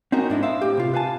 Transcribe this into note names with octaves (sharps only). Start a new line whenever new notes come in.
C4 C#4 D#4 F#4 A#4
G#2 D4 E4 D#5
C5 E5 F5
A2 G4
C3 F4
B4 F5 G#5 A5